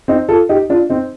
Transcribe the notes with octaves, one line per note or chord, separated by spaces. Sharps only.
C4 D#4
F4 A4
D#4 G4
D4 F4
C4 D#4